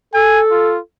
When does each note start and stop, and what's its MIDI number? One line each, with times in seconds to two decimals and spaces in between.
0.14 0.77 69
0.14 0.40 80
0.51 0.79 65